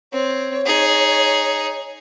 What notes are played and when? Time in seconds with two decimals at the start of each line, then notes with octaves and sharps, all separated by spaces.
0.12 C4 C#5
0.66 D#4 G#4